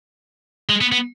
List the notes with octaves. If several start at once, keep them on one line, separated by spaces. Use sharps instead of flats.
G#3
B3
B3